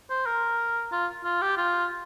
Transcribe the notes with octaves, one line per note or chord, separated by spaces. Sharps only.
C5
A#4
F4
F4
G4
F4